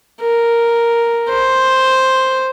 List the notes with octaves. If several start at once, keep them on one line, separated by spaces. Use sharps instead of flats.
A#4
C5